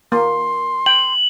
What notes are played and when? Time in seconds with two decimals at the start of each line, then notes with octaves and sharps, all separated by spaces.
0.12 A#3 C6
0.86 G5 F#7